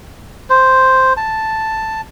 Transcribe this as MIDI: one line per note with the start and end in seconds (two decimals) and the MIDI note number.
0.50 1.13 72
1.17 2.01 81